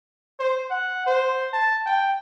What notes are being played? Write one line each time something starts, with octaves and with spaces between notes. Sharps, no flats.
C5
F#5
C5
A5
G5